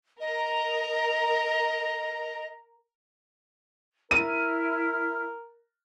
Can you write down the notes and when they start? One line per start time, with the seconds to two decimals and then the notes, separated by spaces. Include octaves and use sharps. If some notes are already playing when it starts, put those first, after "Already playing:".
0.20 A#4 D#5 A#5
4.11 E4 A#4 F6 D#7